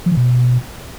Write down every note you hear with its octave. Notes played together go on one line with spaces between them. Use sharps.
F3
E3
B2